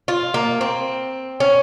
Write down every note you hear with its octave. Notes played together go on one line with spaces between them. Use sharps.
F4
A#3
C4
C#4